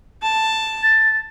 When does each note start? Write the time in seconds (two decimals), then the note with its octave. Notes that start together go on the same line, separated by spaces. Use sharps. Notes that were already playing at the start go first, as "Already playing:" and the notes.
0.22 A5
0.83 A6